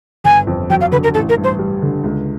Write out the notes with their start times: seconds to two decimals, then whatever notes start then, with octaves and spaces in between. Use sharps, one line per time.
0.24 G1 G#5
0.47 F2
0.70 F#3 G5
0.81 F5
0.92 D3 B4
1.03 A#4
1.14 A1 A4
1.29 A#4
1.37 G2
1.44 C5
1.59 G3
1.82 D3
2.04 C#2